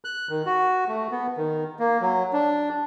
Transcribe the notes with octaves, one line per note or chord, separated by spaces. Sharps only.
F#6
D#3
F#4
A3
B3
D#3
A#3
F#3
D4